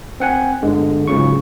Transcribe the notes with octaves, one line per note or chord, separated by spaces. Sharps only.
C4 F#5 G#5
G1 D3 G#3
C#2 G#2 C#3 F#3 C#6